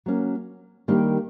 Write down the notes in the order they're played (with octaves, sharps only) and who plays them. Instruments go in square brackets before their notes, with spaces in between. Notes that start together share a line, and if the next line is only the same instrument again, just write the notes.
[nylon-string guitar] F#3 A#3 C#4
D#3 G3 A#3 D4 G4